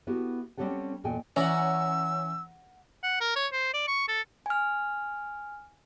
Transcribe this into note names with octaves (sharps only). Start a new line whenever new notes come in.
B3 E4 F#4 G4 A4
G3 C4 C#4 G4 A4 F#5
E2 A#2 A4 D#5 G5 G#5
E3 C#4 D5 F#5 A#5 E6
F#5
A#4
C#5
C5
D5
C#6
A4
G#5 F6